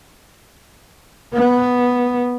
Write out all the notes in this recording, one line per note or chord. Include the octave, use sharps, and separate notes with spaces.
B3